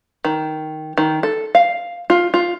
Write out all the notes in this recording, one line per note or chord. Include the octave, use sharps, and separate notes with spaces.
D#3
D#3
A4
F5
F4
F4